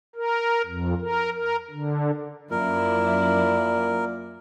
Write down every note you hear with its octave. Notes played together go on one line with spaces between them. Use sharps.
A#4
F2
A#4
A#4
D3
F#2 A#2 E4 A#4 D5